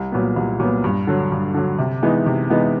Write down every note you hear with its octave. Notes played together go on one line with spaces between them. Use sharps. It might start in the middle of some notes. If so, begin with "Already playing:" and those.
Already playing: C2
A#2 F#3 B3
C2
A#2 F#3 B3
G2
D3 F#3
G2
D3 F#3
C3
E3 G#3 B3 D#4
C3
E3 G#3 B3 D#4